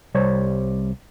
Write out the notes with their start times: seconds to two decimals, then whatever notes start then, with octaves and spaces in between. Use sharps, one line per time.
0.15 C2 G3 C5 C#5